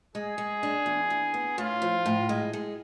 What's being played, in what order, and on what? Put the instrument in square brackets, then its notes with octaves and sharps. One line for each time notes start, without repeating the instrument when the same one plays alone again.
[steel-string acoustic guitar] G#3 [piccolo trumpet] G#4
[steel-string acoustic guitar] G#3
D4
E2
E2
B3
[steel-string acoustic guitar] A2 [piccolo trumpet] F4
[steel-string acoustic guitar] F3
A2
G#3
G#3